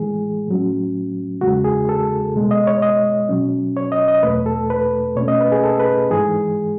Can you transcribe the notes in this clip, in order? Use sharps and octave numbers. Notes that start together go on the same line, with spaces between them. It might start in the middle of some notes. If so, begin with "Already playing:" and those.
Already playing: A2 E3 G#3 G#4
A2 F#3 C#4
E2 C#3 G#3 F#4
G#4
A4
B2 G#3 B3
D#5
C#5
D#5
B2 F#3 C#4
C#5
D#5
D#5
E2 B2 A3 B4
A4
B4
B2 A3 C#4 C#5
D#5
B4
G#4
A4
B4
G#2 E3 G#3 G#4